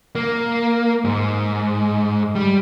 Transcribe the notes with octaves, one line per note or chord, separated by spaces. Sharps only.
A#3
G#2
G3